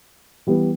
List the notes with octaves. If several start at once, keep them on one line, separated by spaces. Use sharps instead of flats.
E3 G3 B3 E4